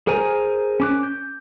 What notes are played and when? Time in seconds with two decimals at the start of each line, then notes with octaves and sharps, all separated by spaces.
0.07 G#4 A#4 C5 G#5 A#5
0.80 C#4 D6 F#6
1.03 G6